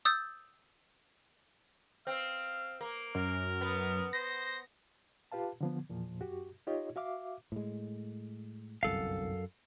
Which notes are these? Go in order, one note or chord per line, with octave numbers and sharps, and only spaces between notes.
D#6 E6 G6 A6
C4 F5
A#3
F#2 A#4
B3
C5 A#6
F4 G4 B4 F5 A5
D3 F3 B3
E2 A#2 F3
F#2 F#4 G4
D#4 F4 G4 C#5 D#5
F#4 E5 F5 D6
A2 G#3
G1 C2 F#2 A4 F5